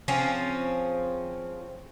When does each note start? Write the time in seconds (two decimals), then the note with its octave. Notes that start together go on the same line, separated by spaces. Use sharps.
0.08 F3 C4 C#4 G#4